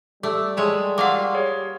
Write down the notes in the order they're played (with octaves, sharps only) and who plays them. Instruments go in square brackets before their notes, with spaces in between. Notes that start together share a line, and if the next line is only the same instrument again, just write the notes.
[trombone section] G3 [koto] A3 [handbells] D6 E6
[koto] G#3 C#5 E5 [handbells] A5 D#6
[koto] A#3 F4 F5 [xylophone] F#5 D6 [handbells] C#6 E6
[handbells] G4 G#4 C#5